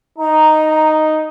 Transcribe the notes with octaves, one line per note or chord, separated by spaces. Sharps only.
D#4 A#5